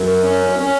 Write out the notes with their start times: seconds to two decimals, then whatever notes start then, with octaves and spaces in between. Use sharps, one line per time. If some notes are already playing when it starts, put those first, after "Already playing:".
Already playing: F#2
0.23 C#4
0.59 C#4